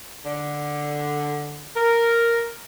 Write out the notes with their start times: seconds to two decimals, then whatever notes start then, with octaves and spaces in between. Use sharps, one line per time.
0.25 D3
1.74 A#4